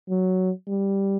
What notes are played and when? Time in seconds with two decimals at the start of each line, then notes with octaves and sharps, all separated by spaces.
0.10 F#3
0.68 G3